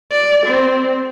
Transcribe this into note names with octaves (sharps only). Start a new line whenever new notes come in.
D5
C4